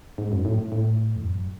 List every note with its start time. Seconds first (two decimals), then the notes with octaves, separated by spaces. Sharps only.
0.18 G#2
0.32 F#2
0.45 A2
0.72 A2
1.16 E2
1.24 F#2